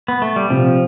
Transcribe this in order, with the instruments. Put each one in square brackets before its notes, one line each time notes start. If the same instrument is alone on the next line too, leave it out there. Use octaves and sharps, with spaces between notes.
[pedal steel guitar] B3
A3
G3
[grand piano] C3 [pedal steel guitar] F3